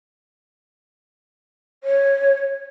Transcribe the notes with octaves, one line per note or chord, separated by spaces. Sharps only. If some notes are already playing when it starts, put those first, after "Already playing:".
C#5